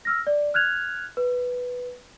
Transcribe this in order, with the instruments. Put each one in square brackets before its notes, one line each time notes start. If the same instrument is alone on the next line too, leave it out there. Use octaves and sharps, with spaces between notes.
[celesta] E6 F6 A#6
D5
F6 F#6 G#6 F7
B4